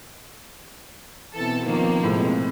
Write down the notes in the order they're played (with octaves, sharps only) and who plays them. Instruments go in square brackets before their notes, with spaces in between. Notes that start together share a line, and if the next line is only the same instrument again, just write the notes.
[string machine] B2 B3 C4 [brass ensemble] E3 [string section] A4
[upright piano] A#2 [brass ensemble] D#3 [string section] F3 A#3
[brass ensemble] F2 G#3 [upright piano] A2 C3